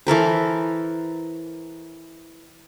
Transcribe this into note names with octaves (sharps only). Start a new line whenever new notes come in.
E3 A4 A#4 C5